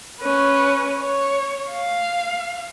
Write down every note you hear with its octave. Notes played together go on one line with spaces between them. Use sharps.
C#4 B4
C#5
F5